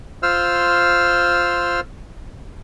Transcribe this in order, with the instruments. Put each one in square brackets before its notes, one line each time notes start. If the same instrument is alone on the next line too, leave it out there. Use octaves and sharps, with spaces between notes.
[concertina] F4 C5 E6 F6